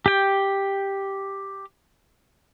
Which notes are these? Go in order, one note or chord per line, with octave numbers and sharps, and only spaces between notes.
G4 G5